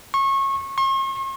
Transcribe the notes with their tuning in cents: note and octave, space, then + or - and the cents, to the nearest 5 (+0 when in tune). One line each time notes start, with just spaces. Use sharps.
C#6 -25
C#6 -45